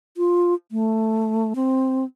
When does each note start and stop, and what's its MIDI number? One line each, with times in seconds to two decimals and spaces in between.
0.17 0.54 65
0.72 1.54 57
1.56 2.04 60